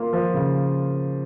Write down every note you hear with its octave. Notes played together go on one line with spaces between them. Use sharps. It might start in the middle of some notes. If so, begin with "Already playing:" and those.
Already playing: A#3 F4
F3
C#3